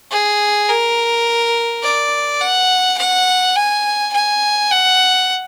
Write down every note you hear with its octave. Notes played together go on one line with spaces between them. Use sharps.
G#4
A#4
D5
F#5
F#5
G#5
G#5
F#5